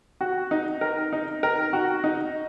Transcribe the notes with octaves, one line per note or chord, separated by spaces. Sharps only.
F#4
D#4
A#4
D#4
A#4
F#4
D#4